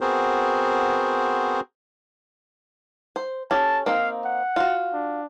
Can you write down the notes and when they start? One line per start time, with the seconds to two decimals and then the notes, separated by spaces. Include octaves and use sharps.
0.01 B3 C4 F#4 G#4 A#4 C5
3.16 C5
3.51 C#4 G4 A4 A5
3.86 A#3 C4 D#4 F5
4.25 F#5
4.56 F4 F#4
4.93 D4